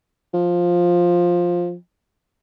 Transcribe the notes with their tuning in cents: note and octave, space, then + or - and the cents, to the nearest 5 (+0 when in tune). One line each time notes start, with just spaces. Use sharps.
F3 +5